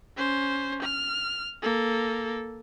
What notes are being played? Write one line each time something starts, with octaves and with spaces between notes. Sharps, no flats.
C#4 C5
F6
A#3 A4